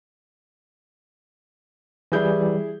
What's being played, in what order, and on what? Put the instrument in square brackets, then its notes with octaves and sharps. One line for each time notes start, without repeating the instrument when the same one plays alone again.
[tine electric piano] E3 G3 [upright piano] E4 G#4 G6